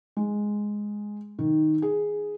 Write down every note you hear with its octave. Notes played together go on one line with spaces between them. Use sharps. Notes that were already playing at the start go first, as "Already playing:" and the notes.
G#3
D#3
G#4